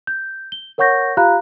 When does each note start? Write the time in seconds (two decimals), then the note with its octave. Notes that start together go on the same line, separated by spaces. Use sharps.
0.07 G6
0.52 G7
0.78 A#4 C#5 F#5 C#6 G6 A#6
1.17 F4 G4 F5 A#5 B5 F#6